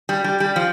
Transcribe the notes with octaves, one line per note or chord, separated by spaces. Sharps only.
G3
G3
G3
F3